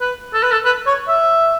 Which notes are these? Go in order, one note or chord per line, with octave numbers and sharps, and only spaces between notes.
B4
A4
B4
A4
B4
C#5
E5